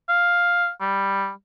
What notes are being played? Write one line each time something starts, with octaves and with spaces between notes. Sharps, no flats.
F5
G3